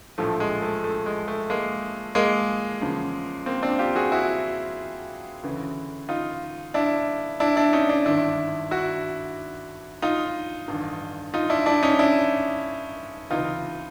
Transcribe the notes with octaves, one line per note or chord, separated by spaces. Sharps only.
A#1 A2 F3 A3
G#3
A3
A3
G#3
A3
G#3 A#3
G#3 A#3
E2 C#3 F3
A#3 C4
C4 D4
F4 G4
F#4 G#4
E4 F#4
D2 C#3 E3
D#4 F4
D4 E4
D4 E4
D4 E4
C#4 D#4
D4 E4
G#1 G2 D#3 D4 E4
E4 F#4
D#4 F4
A1 G2 D#3
D#4 F4
D4 E4
D4 E4
C#4 D#4
D4 E4
C#2 C3 E3 D#4 F4